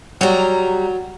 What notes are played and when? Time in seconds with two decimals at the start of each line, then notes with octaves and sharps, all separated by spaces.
0.21 F#3 G3 A#5